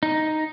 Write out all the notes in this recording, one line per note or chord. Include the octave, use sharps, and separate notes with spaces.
D#4